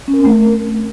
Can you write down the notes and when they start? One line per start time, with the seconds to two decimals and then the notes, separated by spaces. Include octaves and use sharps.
0.08 C#4
0.14 A#4
0.19 C4
0.25 A3
0.31 A#4